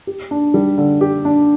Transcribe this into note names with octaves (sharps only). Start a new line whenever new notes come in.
G4
D4
G3
D3
G4
D4